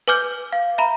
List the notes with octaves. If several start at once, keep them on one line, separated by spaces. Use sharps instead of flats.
B4 G#5 D6 F6 G6 G7
F5
E5 A#5 B5